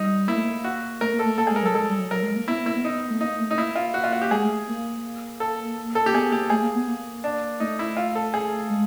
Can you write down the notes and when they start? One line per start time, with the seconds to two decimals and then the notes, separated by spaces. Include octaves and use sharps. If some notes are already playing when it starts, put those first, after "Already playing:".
Already playing: G3 D#4
0.28 A#3 E4
0.36 A3
0.43 A#3
0.64 F#4
1.01 A3 A#4
1.14 A#3
1.19 A4
1.25 A3
1.37 A#3 A4
1.47 G#4
1.51 G#3
1.56 A#4
1.62 F#3 A4
1.75 G#3 A4
1.87 G3
1.99 F#3
2.11 F#3 A#4
2.23 G#3
2.36 A#3
2.47 B3 E4
2.57 B3
2.66 A#3 E4
2.75 B3
2.85 D#4
3.10 A3
3.21 A#3 D#4
3.39 A3
3.51 D#4
3.57 A#3 E4
3.76 F4
3.94 F#4
4.04 F4
4.13 F#4
4.22 G4
4.31 G#3 G#4
4.43 A3
4.68 A#3
5.40 A4
5.95 A4
6.06 G4
6.13 B3 G#4
6.32 A#3 G4
6.50 A3 G#4
6.62 A#3
6.75 B3
6.88 A#3
7.24 D4
7.60 A3 D#4
7.79 E4
7.97 F4
8.15 A4
8.34 G#4
8.70 G#3